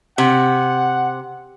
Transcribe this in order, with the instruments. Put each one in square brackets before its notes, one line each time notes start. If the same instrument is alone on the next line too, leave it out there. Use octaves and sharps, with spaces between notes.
[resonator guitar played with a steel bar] C3 [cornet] F#5